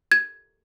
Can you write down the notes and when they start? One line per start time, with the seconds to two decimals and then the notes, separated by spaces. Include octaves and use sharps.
0.12 G#6